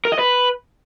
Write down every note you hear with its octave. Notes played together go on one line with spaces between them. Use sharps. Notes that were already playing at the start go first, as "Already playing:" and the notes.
A#4
D#5
B4